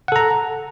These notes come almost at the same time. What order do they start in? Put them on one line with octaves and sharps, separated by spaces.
F#5 A4 A#5